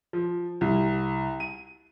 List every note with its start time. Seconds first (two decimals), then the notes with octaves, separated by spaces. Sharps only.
0.13 F3
0.61 C2
1.40 D#7